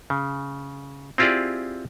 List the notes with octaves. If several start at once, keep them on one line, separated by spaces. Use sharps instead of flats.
C#3
C4 E4 F4 G4 G#4 D5